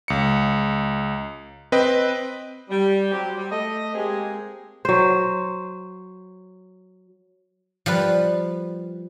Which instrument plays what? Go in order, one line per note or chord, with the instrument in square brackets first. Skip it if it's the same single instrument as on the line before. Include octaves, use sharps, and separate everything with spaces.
[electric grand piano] C#2 C#7
C4 B4 D#5 G5
[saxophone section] G3
F#3 C4 G4
G3
A3 D#5
G#3 A#3 C4 G4 G#4
[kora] F#3 C5
[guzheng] F3 G3 B4